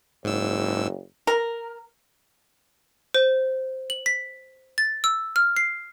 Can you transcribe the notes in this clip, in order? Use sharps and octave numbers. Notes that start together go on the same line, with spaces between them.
F#1 G#2 E6
A#4
C5
F#7
B6
A6
E6
F6
C7